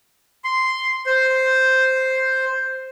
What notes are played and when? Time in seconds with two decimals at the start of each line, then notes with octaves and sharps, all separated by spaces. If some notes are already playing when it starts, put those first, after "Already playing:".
0.44 C6
1.06 C5